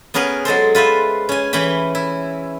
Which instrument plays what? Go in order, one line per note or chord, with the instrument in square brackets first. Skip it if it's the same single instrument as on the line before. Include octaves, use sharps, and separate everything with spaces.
[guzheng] B3 C#4 G#4 A#4 B4
F#3 G#3 A4 C5
F4 B4 C5 E5
C#4 G#5
E3 C#4 G5 B5
E4